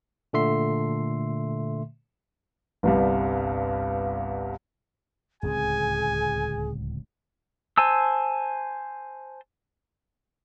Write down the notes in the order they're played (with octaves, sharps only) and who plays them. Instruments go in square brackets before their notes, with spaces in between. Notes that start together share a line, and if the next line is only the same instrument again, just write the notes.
[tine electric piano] A#2 D3 A3 E5 C6 C7
[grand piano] G1 C2 G2
[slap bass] D1 C#2 C4 [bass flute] G#4 [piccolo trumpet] G#5
[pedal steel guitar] C5 G#5 A5 E6